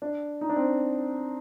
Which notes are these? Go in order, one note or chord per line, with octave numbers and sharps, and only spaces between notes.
D4
D#4
D4
C4